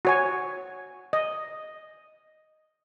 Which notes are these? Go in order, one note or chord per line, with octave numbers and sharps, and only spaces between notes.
F#4 C#5 G#5
D#5